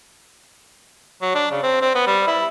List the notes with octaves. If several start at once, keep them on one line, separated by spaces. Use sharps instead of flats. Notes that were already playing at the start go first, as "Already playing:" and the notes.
F#3
D4
C#3
C4
C4
B3
G3
E4